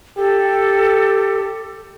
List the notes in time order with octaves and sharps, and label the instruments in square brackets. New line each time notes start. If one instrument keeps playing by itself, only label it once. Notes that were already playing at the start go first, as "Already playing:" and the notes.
[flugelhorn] G4 [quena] A4